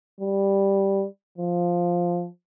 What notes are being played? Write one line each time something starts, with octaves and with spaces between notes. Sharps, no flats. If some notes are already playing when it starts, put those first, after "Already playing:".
G3
F3